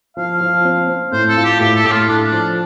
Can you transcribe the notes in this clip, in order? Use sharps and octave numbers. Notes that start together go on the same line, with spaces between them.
F3 F5
F3
C4
C4
A2 C5
A4
F4
G4
A2 G4
A4
A2 G4
F4
A3 D4
D4
F3